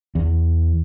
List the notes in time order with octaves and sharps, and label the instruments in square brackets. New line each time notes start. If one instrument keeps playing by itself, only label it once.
[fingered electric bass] E2